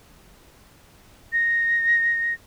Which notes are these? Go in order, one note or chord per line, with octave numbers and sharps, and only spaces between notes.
A#6